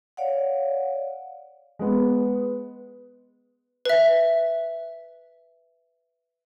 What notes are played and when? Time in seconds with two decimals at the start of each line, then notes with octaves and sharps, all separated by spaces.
0.17 C#5 D5 F5 F#5
1.79 G#3 B3
3.85 B4 E5